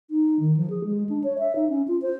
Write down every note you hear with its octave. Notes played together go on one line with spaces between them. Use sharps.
D#4
D#3
F3
G#4
G#3
D4
C#5
E5
D#4
C#4
F4
C5